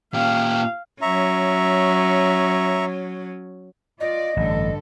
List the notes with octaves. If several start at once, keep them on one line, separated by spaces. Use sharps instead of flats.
A#2 G4 F5
F#3 C#4 E5 A#5 C#6
F4 D5 D#5
A1 G2 D3 A4